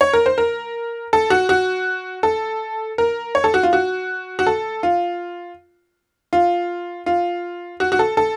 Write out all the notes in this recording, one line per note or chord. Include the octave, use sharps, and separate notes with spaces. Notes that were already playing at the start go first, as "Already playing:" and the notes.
C#5
A#4
C5
A#4
A4
F#4
F#4
A4
A#4
C#5
A4
F#4
F4
F#4
F#4
A4
F4
F4
F4
F#4
F#4
A4
A4